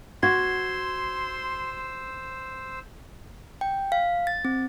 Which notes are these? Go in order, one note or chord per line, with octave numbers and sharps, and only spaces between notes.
F#4 C5 C6 E6 G#6
G5
F5
A6
C4